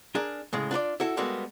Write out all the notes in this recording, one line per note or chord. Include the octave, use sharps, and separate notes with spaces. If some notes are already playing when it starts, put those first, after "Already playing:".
D4 G#4 A#4
A2 C#3 G#3
D4 F4 B4 D5
E4 F#4 A4
G3 G#3 A#3 B3 F#4 A4